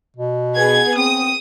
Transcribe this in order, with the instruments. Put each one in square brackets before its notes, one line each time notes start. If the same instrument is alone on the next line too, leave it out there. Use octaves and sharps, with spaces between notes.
[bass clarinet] B2
[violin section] B3 G#4 G#6
[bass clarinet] C4 [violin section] D#6